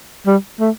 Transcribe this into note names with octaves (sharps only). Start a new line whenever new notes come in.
G3
A3